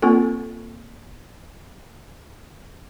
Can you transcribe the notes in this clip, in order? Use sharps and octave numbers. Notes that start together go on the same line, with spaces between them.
A#3 C4 F4 A4